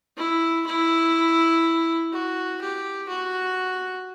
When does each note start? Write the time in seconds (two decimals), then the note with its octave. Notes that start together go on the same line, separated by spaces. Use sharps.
0.17 E4
0.66 E4
2.12 F#4
2.61 G4
3.08 F#4